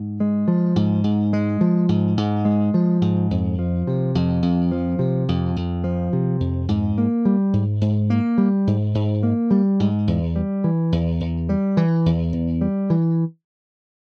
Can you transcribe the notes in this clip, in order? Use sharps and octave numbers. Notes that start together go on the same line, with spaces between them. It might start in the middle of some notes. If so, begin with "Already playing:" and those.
Already playing: G#2
G#3
F3
G#2
G#2
G#3
F3
G#2
G#2
G#3
F3
G#2
F2
F3
C3
F2
F2
F3
C3
F2
F2
F3
C3
F2
G#2
A#3
G3
G#2
G#2
A#3
G3
G#2
G#2
A#3
G3
G#2
E2
G3
E3
E2
E2
G3
E3
E2
E2
G3
E3